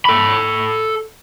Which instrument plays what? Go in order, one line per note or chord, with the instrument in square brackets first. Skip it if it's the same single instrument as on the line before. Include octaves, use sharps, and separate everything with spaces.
[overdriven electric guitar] A4 B5